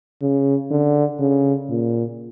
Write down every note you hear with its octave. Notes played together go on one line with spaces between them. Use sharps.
C#3
D3
C#3
A#2